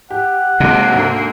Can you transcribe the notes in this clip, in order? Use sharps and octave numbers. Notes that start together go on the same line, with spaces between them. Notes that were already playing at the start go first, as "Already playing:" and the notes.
G4 F#5
B1 C3 G#3 A#3
D2 G#2